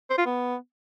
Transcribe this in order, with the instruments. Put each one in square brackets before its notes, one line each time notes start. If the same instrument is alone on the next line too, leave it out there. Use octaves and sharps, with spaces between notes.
[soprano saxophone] C5
F4
B3